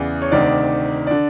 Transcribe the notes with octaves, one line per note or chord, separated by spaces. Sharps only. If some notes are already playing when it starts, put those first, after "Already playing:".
Already playing: E2 C#3 E3 D5
C#5
D2 C3 D#3 D5
D3 D5